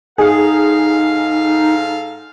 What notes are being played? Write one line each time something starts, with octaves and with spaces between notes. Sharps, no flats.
G#2 D#4 G#4 A4 F5